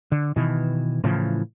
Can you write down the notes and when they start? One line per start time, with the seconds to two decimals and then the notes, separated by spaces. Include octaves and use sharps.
0.12 D3
0.36 B2 D#3 E3
1.04 A2 C#3 E3 F3